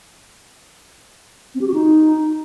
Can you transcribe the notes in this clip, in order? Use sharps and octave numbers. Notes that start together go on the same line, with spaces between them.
C4
G4
F#4
D#4